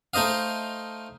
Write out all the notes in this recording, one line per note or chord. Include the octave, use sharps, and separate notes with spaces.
A3 D#4 C5 D#5 F5